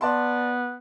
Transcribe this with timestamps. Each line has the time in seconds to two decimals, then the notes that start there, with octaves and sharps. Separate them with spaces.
0.01 B3 D5 A5 C6